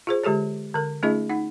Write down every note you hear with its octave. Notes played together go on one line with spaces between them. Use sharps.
F4 G#4 C5
D3 G#3 G4 A4 C#5
D3 A#4
A3 C#4 D#4 F4 G#4 D#5
D#4 F#5